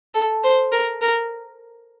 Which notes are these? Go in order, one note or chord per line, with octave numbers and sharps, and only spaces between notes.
A4
C5
A#4
A#4